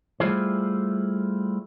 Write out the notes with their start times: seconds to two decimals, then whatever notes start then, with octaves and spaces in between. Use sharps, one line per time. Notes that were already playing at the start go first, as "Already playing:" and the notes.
0.20 G3 A3 E4 F4 G#4 C5